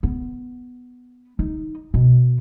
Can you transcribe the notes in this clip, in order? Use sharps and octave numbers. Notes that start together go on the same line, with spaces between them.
B3
D#4
B2